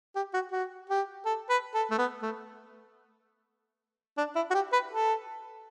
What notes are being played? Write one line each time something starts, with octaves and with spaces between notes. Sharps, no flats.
G4
F#4
F#4
G4
A4
B4
A4
A3
B3
A3
D4
E4
F#4
G4
B4
A4